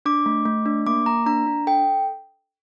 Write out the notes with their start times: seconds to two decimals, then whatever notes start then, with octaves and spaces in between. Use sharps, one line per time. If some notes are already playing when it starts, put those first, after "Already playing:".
0.06 D4 D6
0.26 A3
0.45 A3
0.66 D4
0.86 A#3 D6
1.06 A#3 A#5
1.26 D4 A#5
1.47 D4
1.67 A4 G5